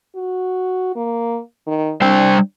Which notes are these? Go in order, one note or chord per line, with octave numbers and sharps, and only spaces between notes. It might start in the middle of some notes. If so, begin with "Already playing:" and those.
F#4
A#3
D#3
G3 D4 C5 G5